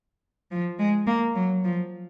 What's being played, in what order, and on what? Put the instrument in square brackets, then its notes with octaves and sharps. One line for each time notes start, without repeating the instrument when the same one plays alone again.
[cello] F3
G#3
A#3
F#3
F3